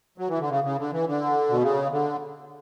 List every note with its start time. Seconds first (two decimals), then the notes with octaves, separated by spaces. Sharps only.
0.18 F#3
0.29 E3
0.39 D3
0.50 C#3
0.64 C#3
0.78 D3
0.92 E3
1.06 D3
1.50 B2
1.62 C#3
1.91 D3